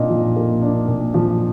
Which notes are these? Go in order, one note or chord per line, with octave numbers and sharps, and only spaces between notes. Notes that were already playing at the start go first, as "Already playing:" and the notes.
Already playing: A#2 D4 D#4 D#5
F3
A#3
D4
A#2
F3